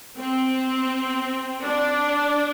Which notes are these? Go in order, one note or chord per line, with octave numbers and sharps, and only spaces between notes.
C4
D4